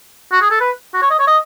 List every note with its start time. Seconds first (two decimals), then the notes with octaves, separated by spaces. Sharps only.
0.32 F#4
0.42 G#4
0.50 A4
0.60 B4
0.94 F#4
1.02 C#5
1.10 D#5
1.19 C#5
1.27 D#5